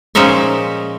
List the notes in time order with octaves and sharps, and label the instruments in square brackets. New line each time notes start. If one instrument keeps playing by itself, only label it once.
[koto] A#2 F3 G#3 C#4 D#4 E5